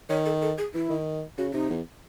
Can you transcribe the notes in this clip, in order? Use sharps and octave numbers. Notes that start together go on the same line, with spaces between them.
D#3 C#5
A4
A4
G#4
E3 E4
D#3
C#3 F#4
C3 D#4
E2